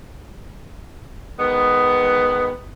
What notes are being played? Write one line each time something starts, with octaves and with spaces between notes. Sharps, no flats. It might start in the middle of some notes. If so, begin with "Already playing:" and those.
D#3 G#3 B3